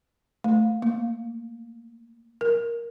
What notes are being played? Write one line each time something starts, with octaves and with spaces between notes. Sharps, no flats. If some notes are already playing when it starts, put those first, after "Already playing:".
A3
A#3
A#4